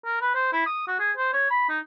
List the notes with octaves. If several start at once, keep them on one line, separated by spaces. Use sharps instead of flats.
A#4
B4
C5
E4
D#6
F#4
G#4
C5
C#5
B5
D#4